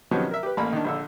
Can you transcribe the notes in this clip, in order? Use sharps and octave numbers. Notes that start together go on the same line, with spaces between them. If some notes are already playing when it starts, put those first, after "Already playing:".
C3 D#3 F3 F#3 B3 C#4
A#4 E5
G4 B4
A1 A#3 A#5 B5
D#3 D4
A#1 D3 E6